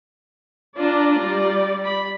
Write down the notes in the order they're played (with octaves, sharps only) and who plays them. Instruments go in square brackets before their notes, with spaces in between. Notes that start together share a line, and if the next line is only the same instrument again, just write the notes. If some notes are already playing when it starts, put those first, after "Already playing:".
[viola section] D4 D5 [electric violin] F4 A#5
[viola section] G3 D5
[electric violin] B5